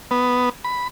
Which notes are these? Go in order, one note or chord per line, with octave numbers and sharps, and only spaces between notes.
B3
B5